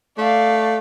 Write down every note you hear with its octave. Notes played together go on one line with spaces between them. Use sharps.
A3 D5 F5